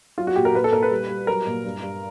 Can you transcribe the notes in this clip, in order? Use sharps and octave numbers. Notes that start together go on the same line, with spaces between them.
F#3 F4
F#4
A#2 G4
A#4
A#2 B4
A4
A#2 A#4
B4
G3
G3
F#3 A#4
A#2
G2
G2